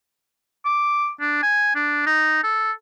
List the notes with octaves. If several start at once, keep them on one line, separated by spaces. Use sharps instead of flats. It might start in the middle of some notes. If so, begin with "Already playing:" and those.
D6
D4
G#5
D4
D#4
A4